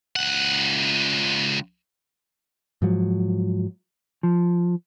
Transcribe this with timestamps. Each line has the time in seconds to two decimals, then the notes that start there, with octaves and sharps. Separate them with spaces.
0.16 C#2 F#5
2.82 G#2 F3 F#3
4.23 F3